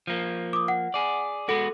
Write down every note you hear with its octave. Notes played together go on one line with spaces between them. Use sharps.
F3 A#3
D6 D#6
F#5
G#4 D5
G#3 B3 F#4 A4